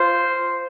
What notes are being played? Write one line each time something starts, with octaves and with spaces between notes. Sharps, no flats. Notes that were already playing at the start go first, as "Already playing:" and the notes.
Already playing: F4 C5